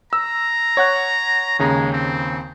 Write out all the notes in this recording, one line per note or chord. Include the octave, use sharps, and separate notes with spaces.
A#5 E6
C#5 F#5 F#6
D#2 C#3 G#3 A#5
C4